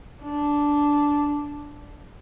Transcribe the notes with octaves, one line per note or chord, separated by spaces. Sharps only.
D4